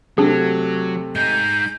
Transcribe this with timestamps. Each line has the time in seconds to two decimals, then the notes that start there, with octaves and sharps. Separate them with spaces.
0.18 C3 F#3 A3 D4 G#4
1.16 G#3 D#4 G6